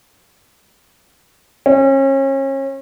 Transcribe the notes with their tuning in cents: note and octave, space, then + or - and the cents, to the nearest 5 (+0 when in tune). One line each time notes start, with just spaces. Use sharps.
C#4 -35